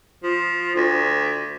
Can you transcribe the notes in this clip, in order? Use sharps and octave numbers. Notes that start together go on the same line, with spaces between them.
F3
D2